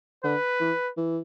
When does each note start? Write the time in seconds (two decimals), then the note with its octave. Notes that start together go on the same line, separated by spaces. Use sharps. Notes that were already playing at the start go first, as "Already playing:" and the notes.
0.24 D3 B4
0.61 E3
0.97 E3